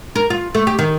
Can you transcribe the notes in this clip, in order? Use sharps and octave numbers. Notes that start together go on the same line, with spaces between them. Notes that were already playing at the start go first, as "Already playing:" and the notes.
A#4
F4
A3
G4
D#3